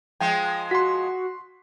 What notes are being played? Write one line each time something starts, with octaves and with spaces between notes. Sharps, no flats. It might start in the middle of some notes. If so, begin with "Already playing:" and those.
F3 G#3 G5
F#4 C6 B6